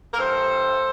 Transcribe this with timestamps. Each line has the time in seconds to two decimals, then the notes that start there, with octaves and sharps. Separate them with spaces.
0.13 A#4
0.18 G2 E3 A4 C5